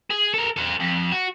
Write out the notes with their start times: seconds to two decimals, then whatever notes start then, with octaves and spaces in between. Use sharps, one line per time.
0.11 G#4
0.34 A4 A#4
0.57 A4 C5
0.80 F2
1.12 F#4